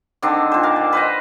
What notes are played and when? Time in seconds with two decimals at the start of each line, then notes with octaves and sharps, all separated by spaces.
0.22 D3 D#3 C4 D4
0.52 A#2 C5
0.63 A#4 F5
0.76 D5
0.93 B4 C5 D#5